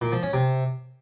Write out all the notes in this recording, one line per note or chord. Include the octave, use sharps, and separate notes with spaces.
A#2
F3
C#4
C3